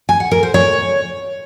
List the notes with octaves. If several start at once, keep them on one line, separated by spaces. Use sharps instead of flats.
G#5
F#5
A#4
C5
C#5